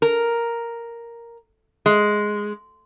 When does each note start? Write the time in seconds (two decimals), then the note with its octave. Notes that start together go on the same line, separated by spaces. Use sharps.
0.02 A#4
1.86 G#3